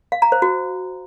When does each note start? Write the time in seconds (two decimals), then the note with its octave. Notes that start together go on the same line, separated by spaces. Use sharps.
0.12 F5
0.22 A#5
0.32 C5
0.42 F#4